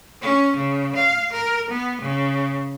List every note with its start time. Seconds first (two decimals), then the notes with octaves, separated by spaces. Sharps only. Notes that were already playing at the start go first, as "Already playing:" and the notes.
0.22 C#4
0.56 C#3
0.95 F5
1.33 A#4
1.70 B3
2.02 C#3